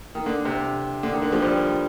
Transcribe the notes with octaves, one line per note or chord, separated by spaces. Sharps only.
D#3
D3
C3
D3
D#3
D3
F3
G3